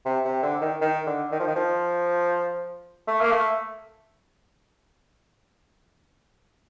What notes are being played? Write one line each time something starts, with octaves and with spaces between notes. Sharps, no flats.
C3
C3
D3
D#3
D#3
D3
D#3
F3
D#3
F3
A3
A#3
A3